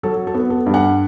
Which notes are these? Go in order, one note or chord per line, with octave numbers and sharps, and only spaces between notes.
F#3 A4
A4
B3
A4
G2
F#5